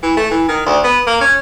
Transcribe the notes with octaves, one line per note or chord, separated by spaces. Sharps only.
E3
A3
E3
D#3
D2
B3
A#3
C#4